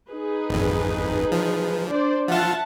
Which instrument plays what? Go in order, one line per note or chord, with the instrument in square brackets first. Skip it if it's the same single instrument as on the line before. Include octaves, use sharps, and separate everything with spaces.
[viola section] D#4 G#4 B4
[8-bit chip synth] G#1 F2
F3
[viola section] D4 C5 D5
[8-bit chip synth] F3 F4 [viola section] E5 F#5 A5